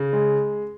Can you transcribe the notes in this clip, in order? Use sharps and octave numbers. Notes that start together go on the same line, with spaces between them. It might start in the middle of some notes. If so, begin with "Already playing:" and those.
Already playing: C#3
G#3